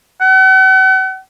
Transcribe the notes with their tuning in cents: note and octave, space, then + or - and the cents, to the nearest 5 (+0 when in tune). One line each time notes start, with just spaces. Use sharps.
F#5 +40